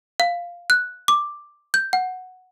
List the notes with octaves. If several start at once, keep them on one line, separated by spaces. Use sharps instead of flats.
F5
F#6
D6
G6
F#5